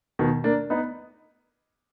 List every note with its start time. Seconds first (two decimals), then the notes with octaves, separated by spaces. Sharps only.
0.19 B2 D#3
0.44 A#3 D4
0.70 B3 D#4